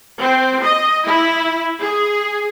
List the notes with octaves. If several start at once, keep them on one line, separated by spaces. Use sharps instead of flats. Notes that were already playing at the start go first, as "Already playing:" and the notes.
C4
D#5
E4
G#4